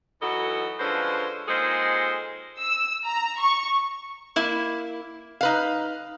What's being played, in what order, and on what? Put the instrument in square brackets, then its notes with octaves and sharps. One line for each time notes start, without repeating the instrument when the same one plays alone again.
[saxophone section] E3 F#3 D#4 E4 F#4 A4
D3 F3 G#3 C#4 B4 C5
A#2 D#3 G#3 G#4 A4 C5
[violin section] E6
A#5
C#6
[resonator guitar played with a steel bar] A#3 E4
D#4 B4 F5